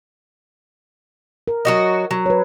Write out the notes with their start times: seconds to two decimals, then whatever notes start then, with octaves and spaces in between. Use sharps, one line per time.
1.48 A#4
1.65 F#3 F#4 D#5
2.11 F#3
2.26 B4 C#5